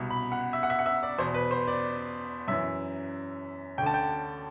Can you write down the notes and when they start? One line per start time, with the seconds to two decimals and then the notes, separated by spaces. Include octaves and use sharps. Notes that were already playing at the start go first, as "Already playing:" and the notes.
Already playing: C2 B2
0.10 B5
0.32 F#5
0.53 E5
0.63 F#5
0.70 E5
0.79 F#5
0.86 E5
1.03 D5
1.18 E2 B2 C5
1.34 B4
1.51 C5
1.67 D5
2.48 F#2 E3 E5
3.78 D2 G5
3.82 D3 A5
3.94 G5